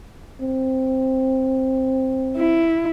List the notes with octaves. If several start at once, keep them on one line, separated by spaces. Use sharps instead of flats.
C4
E4